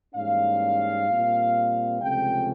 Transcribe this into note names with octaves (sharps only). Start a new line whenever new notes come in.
G#2 E3 G3 A#3 C#4 F5
A#2 G3 C4
C#2 C3 F3 A3 C#4 G5